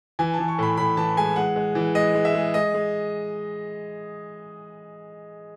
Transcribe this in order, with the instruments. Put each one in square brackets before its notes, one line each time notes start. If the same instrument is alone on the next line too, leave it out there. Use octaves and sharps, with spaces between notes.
[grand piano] E3 G#5
A5
E3
C#6
A2 B5
A2 B5
E3 A5
G#3 G#5
G#3 F#5
G#3
E3
G#3 D#5
G#3
E5
G#3
G#3 D#5
G#3